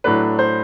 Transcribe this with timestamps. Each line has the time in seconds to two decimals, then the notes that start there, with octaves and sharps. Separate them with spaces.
0.04 A2 F#3 A3 D4 B4
0.39 C5